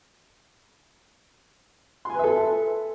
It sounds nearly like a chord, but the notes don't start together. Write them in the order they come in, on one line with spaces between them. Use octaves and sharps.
C6 G#5 B4 E5 A4